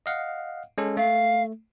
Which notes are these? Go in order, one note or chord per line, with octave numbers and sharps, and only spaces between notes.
D#5 F5 F#5
G#3 C#4 A4
A3 F5